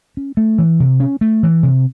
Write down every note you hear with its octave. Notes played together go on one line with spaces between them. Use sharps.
C#4
A3
E3
C3
C#4
A3
E3
C3